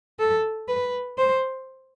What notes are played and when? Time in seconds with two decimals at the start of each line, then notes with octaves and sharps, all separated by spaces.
0.19 A4
0.68 B4
1.18 C5